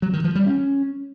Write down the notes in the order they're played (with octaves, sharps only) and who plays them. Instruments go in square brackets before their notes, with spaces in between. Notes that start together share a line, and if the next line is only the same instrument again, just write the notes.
[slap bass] F#3
D#3
F3
G3
C#4